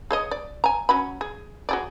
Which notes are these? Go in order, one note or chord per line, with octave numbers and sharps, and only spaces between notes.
G#4 C#5 D#5
D5
G#5 A#5
F#3 C#4 B5
G#4
F#4 G#4 D5